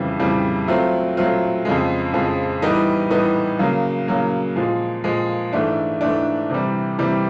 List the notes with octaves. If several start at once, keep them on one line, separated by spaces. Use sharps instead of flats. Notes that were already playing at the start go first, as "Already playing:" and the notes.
Already playing: F2 C#3 E3 G3
F2 C#3 E3 G3
F#3 A3 C4 F4
F#3 A3 C4 F4
F2 C#3 F3 G#3
F2 C#3 F3 G#3
A2 E3 G3 B3 D#4
A2 E3 G3 B3 D#4
C#3 F#3 A#3
C#3 F#3 A#3
A#2 F3 G#3
A#2 F3 G#3
G#2 E3 A3 D4
G#2 E3 A3 D4
C3 E3 G3
C3 E3 G3